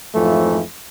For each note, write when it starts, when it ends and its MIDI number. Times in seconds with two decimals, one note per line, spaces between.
0.14 0.61 41
0.14 0.61 44
0.14 0.61 52
0.14 0.61 53
0.14 0.61 57